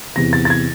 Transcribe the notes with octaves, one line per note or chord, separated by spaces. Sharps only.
E2 C3 E3 A#6
A6
A6
G#6